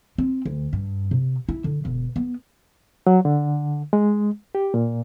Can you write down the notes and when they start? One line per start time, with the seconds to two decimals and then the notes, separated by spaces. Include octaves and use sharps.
0.18 C4
0.45 D2
0.73 G2
1.11 C3
1.49 E4
1.64 D3
1.85 E1
2.16 B3
3.07 F#3
3.25 D3
3.93 G#3
4.55 G4
4.74 A#2